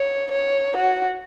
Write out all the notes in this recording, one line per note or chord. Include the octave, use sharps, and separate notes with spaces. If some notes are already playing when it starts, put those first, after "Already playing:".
Already playing: C#5
C#5
F#4